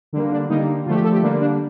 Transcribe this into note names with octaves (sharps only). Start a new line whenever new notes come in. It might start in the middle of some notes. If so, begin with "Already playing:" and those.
D3 G3 A#3 D4
D4
D3 G3 A#3 D#4
D3 F3 A3 F4
G4
A4
G4
D3 G3 A#3 D4
D4